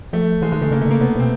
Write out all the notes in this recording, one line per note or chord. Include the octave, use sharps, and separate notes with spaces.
F3 A3
E3 G#3
D#3 G#3
D3 A3
C#3 A#3
A3
C#3 A#3
C3 B3
B2 C4